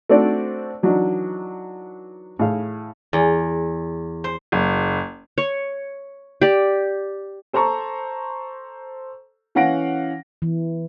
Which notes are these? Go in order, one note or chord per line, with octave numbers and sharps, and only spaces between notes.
A3 C4 D4 F#4 C5 D5
E3 F#3 D4 D#4 F#4
A2 E4 G#4 F5
E2
C5
F#1
C#5
G4 D5
A4 C5 A5 A#5 C#6
E3 C#4 F5 F#5 A#6 D7
E3